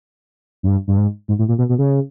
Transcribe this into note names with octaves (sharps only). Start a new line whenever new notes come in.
F#2
G2
G2
G#2
G#2
A2
A#2
B2
B2
C#3